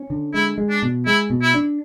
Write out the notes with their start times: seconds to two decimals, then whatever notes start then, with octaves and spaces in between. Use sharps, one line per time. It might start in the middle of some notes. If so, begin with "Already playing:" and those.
Already playing: C#4
0.10 D3
0.34 G#3 E4
0.58 G#3
0.70 D4
0.83 B2
1.06 G#3 E4
1.30 B2
1.42 E4
1.54 D4